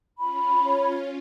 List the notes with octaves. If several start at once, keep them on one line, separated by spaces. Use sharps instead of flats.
C#4 F4 B5
C#5